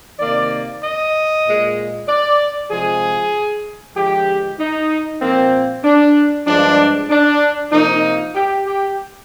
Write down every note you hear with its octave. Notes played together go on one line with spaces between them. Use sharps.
C3 D#3 A#3 D5
D#5
A#2 G#3
D5
C3 F3 G#3 G#4
D3 F3 G#3 G4
D#4
A#2 F3 A#3 C4
D4
G2 F3 G#3 D4
D4
C3 F3 A#3 D#4
G4
G4